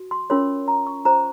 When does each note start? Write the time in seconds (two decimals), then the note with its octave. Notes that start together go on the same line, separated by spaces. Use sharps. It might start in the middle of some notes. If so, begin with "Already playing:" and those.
Already playing: F#4
0.11 C6
0.30 C#4 F4 A#4 C#5 C6
0.68 A#5
0.87 C#6
1.05 F4 C5 A#5